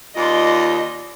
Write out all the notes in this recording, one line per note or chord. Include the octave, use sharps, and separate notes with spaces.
D#2 F4 D5 D#5 C6